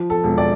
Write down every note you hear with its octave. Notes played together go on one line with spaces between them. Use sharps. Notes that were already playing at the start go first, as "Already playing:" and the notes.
Already playing: F3
A4
E1
D5